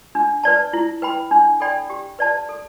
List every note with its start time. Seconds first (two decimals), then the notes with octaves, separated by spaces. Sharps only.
0.15 D4
0.44 B4 D5 A5
0.73 E4
1.02 B4 G5 B5
1.31 D4
1.60 A4 D5 G5 B5
1.90 G4
2.19 B4 D5 A5
2.49 A4